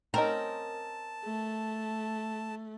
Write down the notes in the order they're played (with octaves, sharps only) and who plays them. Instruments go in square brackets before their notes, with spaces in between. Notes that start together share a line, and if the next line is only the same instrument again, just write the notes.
[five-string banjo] C4 C#4 D#4 [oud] A#4 [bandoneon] A5
[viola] A3